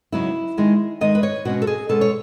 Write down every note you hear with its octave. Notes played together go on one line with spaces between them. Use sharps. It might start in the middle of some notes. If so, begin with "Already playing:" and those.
C#3 F#3 B3 D#4 E4
D#3 G#3 D#4
D#3 G#3 D#4 D#5
B4
C#5
B2 G#3 C#4 F#4
A4
G#4
B2 G#3 C#4 A4
C#5